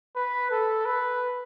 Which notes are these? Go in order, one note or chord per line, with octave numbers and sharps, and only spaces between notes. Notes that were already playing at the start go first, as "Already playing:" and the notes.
B4
A4
B4